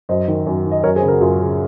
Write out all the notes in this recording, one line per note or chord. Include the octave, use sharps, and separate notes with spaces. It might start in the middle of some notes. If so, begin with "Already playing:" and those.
F#2 C5 D#5
D#3
F#2
D#3
D#5
F#2 A#4 C#5
G#4 C5
C#3
F#4 A#4
F#2 F4 G#4
C#3